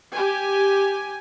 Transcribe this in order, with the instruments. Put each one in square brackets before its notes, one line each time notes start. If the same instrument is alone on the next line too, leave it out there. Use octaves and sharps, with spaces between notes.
[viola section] G4 G#5